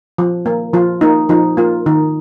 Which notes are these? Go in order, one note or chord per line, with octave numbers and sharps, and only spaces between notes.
F3
A#3
F3 F4
A#3 D#4
F3 D#4
A#3 F4
D#3 D#4